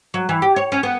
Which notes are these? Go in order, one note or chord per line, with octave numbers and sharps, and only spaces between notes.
F#3
E3
G4
C#5
C#4
B3